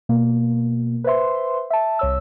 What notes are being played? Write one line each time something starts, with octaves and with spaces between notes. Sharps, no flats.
B2 A#3
B4 C5 E5 C6
E5 A5
C2 C#5 E6